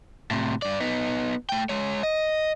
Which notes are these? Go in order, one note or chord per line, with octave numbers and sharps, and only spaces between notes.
A2 C3
G2 D5
B3 D#4
A3 G5
G#3 C#5
D#5